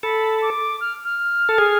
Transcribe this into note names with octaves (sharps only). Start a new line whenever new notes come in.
A4 B5
D6
F6
F6
A4
G#4